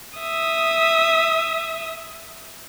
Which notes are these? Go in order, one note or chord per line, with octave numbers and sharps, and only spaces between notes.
E5 D#6